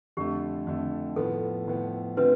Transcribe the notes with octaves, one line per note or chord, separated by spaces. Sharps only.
F2 D3 A3 G4
F2 D3 A3
A2 F3 B3 A4
A2 F3 B3
D3 A3 C4 F4 B4